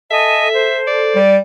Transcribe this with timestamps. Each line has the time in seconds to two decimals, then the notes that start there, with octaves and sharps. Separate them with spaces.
0.10 A4 D#5 E5 G#5 A5
0.52 C5
0.87 D5
1.16 G3